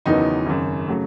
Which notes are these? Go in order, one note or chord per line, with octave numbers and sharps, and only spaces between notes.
F#1 E2 D#3 F#3 B3 D#4
G#1 F#2 C#3
C#3 F#3 A3